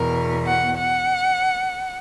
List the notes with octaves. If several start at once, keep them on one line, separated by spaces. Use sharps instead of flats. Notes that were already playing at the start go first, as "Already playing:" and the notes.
Already playing: E2 B2 A#4
F#5
F#5